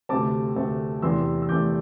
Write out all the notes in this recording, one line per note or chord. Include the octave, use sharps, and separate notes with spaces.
D2 C3 A3 C4 A5 D6
D2 C3 A3 C4
E2 C3 A3 C6 E6
E6
E2 C3 A3 D6 G6